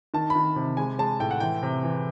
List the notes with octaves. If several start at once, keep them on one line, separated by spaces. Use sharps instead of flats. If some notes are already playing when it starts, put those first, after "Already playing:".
D#3 A5
B5
D#3
C3
G#3 G#5
G#3 A5
A2 G5
F#5
E3 G5
C3
E3